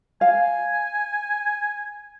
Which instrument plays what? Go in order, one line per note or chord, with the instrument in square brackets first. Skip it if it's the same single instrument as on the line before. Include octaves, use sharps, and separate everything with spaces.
[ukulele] F5 [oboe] G#5